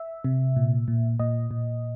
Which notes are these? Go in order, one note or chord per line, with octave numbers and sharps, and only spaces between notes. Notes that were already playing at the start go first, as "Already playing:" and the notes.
Already playing: E5
C3
A#2
A#2
A#2 D#5
A#2